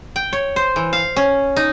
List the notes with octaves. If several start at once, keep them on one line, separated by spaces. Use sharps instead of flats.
G5
C#5
C5
E3
F5
C#4
D#4